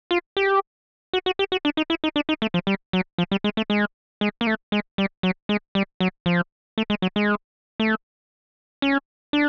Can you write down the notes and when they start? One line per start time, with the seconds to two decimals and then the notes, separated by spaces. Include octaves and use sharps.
0.11 F4
0.37 G4
1.13 F#4
1.26 F#4
1.39 G4
1.52 F#4
1.65 D4
1.77 D#4
1.90 E4
2.04 D#4
2.16 D4
2.29 D#4
2.42 A3
2.54 F3
2.67 G3
2.93 F#3
3.18 F3
3.31 G3
3.44 G#3
3.57 A3
3.70 G#3
4.21 G#3
4.41 A#3
4.47 A3
4.72 G#3
4.98 G3
5.23 F#3
5.49 G#3
5.75 G3
6.00 F#3
6.26 F3
6.78 A3
6.90 G#3
7.02 F#3
7.16 G#3
7.80 A3
8.82 C#4
9.33 D4